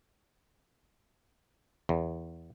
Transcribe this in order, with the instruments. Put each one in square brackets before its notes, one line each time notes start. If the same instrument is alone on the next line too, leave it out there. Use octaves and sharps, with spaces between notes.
[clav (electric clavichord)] E2